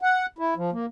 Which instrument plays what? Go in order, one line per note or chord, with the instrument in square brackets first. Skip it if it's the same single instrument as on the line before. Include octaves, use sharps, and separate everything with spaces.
[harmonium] F#5
E4
F3
A#3